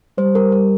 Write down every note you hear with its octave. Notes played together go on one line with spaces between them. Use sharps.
G3 C5
A#4
A#4